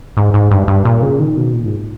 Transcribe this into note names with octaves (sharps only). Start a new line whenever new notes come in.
G#2
G#2
G2
G2
A#2
C#3
D#3
B2
A#2
G#2